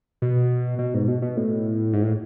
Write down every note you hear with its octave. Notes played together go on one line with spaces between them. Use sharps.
B2
B2
G#2
B2
B2
A2
G#2
A2